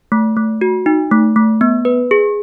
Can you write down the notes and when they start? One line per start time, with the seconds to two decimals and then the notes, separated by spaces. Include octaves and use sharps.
0.12 A3
0.36 A3
0.61 F#4
0.86 D#4
1.11 A3
1.36 A3
1.61 B3
1.85 B4
2.11 G#4